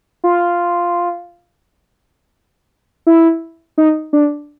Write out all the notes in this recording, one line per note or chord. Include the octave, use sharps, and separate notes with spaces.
F4
E4
D#4
D4